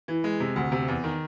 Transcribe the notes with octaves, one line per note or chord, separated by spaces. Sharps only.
E3
G#3
C3
D2
C3
E2
D#3